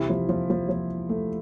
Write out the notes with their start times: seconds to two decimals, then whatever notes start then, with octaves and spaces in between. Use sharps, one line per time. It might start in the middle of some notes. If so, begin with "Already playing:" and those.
Already playing: C2 C3 E3 E4
0.10 F3
0.29 F3
0.50 F3
0.69 F3
1.09 A3